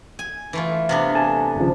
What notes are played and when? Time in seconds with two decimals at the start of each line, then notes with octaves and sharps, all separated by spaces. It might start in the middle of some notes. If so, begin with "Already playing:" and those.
0.19 G#5
0.53 E3 A3 F4
0.89 C3 B3 D4 F5
1.14 A4 G#5 A5
1.56 G#1 C#3 F3